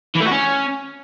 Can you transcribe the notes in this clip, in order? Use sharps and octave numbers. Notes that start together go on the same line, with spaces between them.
E3
A3
F#4
C#4